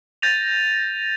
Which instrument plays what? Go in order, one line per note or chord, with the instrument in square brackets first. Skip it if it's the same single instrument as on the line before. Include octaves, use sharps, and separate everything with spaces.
[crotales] G6 A6 A#6 D#7 F7